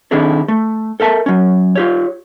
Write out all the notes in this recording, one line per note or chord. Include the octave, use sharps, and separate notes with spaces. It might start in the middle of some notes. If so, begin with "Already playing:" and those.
D#3 C4 D4 E4 G#4 A4
A3
A4 A#4 E5 A5
F#3 C#4
F4 G4 C#5